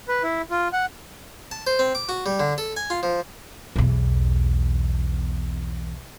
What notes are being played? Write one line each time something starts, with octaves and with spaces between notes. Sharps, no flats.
B4
E4
F4
F#5
A5
C5
C4
D6
F#4
G3
D3
A4
G#5
F4
F3
B1 E2